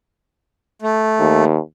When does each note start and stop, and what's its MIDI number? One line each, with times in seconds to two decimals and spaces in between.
0.82 1.45 57
1.19 1.60 39